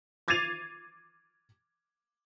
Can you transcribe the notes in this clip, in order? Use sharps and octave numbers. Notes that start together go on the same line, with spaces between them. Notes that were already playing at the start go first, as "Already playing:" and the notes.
D6 G#6 A6 C7 D#7 F7